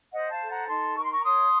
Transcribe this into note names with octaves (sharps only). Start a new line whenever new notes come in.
C5 D#5 F#5
F5 A5
A4
F#5 A#5
D#4 A5 C6
A#4 C#6
C6
A#5 C#6
C#5 C6 D#6